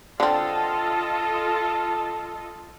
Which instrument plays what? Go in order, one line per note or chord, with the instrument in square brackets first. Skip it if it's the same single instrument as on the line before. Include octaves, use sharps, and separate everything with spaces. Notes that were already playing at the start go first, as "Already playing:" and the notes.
[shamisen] D3 C4 [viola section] F4 A4 D#5 [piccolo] A5